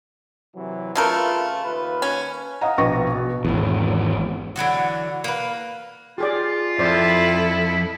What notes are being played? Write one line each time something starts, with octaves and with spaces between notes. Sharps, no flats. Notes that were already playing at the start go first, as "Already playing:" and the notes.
C3 E3 F#3
C#3 A3 F4 A#4 B4
D#2 F4 B4
C#4
D#5 F5 F#5 A#5
A#1 B2 B4 C#6 A#6
B2
G#1 E2
D3 E3 F#3 F#4
A#3 B4
F4 G4 G#4 D5
F2 E4 A4 C5 D5